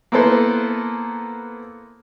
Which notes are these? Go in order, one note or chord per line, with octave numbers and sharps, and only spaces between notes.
A#3 B3 E4 A4 B4 C5